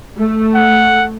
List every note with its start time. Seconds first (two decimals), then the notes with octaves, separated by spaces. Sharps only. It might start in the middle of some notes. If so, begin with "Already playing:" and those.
0.20 A3
0.55 F#5